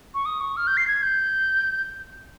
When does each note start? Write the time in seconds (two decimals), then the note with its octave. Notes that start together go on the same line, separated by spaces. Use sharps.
0.14 C#6
0.26 D#6
0.41 C#6
0.57 F6
0.67 G6
0.77 C7
0.88 G#6
1.03 G6